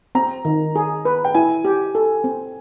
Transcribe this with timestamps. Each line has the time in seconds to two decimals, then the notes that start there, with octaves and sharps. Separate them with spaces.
0.15 C4 A#5
0.45 D#3
0.76 G#4
1.05 B4
1.25 G5
1.34 E4 G#5
1.65 G4
1.95 A4
2.24 C4